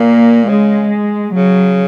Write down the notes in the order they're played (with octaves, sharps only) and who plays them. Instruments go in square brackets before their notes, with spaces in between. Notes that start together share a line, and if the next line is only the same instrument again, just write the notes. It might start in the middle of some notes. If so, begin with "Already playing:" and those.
Already playing: [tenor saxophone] A#2 [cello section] A#3
[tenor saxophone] C#3 [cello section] G#3
[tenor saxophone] C#3 [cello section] F#3